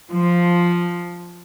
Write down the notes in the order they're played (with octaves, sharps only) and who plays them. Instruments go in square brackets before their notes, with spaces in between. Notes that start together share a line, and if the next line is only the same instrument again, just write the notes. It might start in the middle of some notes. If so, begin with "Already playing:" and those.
[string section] F3